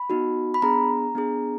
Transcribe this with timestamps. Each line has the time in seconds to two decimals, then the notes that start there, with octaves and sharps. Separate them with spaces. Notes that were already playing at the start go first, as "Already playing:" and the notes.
Already playing: B5
0.10 B3 D#4 F#4
0.54 B5
0.62 B3 D4 G#4 A#5
1.15 B3 D4 G#4